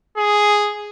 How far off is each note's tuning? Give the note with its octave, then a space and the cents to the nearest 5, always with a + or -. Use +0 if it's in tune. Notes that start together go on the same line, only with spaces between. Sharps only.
G#4 +0